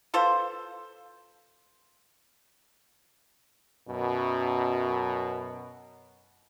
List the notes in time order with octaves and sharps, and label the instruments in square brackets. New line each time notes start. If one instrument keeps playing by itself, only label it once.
[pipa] F4 A4 B4 C5
[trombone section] F#2 B2